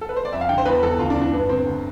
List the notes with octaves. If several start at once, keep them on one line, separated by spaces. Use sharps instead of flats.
A4
B4
C5
D5
F2 E5
F5
D3 G5
C5
E2 B4
E2 A4
D2 F4
D4
D3
D4
G2 B3
D3 C4
D2